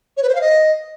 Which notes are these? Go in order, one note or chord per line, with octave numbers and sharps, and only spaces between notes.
C#5
B4
C5
F5
D#5